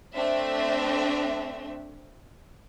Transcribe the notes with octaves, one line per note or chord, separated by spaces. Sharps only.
A3 C4 D4 E5